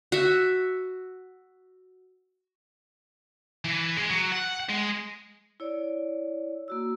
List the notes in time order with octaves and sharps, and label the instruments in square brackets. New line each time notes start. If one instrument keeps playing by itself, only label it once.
[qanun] F#4 E5
[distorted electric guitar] E3
G#3
F#3
F#5
G#3
[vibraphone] E4 C#5 D5
A#3 F#4 E6